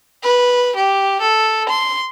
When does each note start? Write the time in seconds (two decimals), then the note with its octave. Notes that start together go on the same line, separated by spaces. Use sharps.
0.23 B4
0.76 G4
1.21 A4
1.69 C6